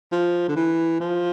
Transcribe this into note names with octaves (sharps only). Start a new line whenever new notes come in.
F3
D3
E3
F3